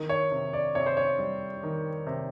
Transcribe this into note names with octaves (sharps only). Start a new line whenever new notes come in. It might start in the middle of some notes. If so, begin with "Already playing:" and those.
Already playing: D#3
C#5
C3
D5
C3 C#5
C5
C#5
G3
D#3
C3